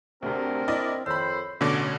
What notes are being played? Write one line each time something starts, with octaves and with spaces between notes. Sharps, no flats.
D2 C3 C4 D4 A#4
E4 D5 D#5
F2 D#3 C5 C#5 B5 E6
A1 B2 D3 C#4 D6